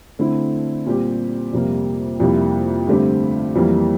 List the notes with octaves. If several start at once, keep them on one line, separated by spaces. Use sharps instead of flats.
D3 A3 C4 E4
A#2 G3 C4 G4
F2 C3 G3 A#3
F2 C3 G3 A#3 E4
G2 D3 A3 C4 G4
F2 E3 G3 A#3